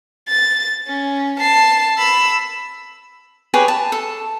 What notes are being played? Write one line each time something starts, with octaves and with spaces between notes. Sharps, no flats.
A6
C#4
A5 C7
B5 E6
G4 G#4 B4 C#5
A5
A4